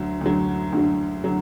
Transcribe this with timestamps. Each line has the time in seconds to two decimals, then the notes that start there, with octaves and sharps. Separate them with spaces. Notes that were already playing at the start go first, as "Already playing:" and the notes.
Already playing: D2 D3 F#3
0.21 D2 D3 F#3
0.72 D2 D3 F#3
1.24 D3 F#3